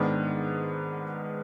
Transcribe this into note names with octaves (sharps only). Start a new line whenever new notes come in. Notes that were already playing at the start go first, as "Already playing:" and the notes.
Already playing: G#2 D#3 B3 D4